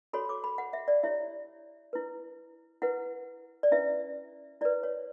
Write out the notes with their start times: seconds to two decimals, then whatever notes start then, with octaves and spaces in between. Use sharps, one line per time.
0.13 F#4 A4 C#5 B5
0.29 D6
0.44 B5
0.58 F#5
0.73 E5
0.88 D5
1.03 E4 G4 C#5 E5
1.93 E4 B4
2.82 E4 B4 F#5
3.63 D5
3.71 C#4 E4 B4 E5
4.61 E4 B4 D5
4.83 C#5